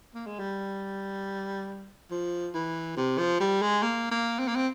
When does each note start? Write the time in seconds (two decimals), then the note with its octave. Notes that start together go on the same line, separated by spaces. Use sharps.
0.15 A#3
0.26 G#3
0.39 G3
2.11 F3
2.54 E3
2.97 C3
3.18 F3
3.40 G3
3.62 G#3
3.83 A#3
4.11 A#3
4.39 C4
4.48 A#3
4.56 C4